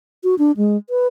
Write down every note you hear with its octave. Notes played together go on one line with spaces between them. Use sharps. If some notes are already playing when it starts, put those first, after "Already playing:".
F#4
D4
G#3
B4